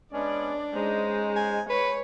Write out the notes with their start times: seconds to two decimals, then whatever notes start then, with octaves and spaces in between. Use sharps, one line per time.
0.13 G#3 B3 C#4 D4 D5
0.75 G#3 C#4 D#4 C5
1.36 G#5
1.70 B4 C#5